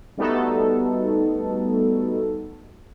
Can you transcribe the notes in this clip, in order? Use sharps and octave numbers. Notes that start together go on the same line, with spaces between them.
G3 A3 B3 D#4 F#4 A4